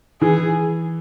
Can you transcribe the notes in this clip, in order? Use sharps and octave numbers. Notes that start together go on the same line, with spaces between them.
E3 G#4